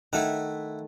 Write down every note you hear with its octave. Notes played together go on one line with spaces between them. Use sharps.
D#3 A3 E4 F#5